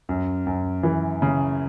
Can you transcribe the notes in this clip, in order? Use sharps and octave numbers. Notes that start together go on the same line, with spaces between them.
F#2
F#2
E3
C#3